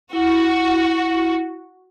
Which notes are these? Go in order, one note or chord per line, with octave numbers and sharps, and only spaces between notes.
E4 F#4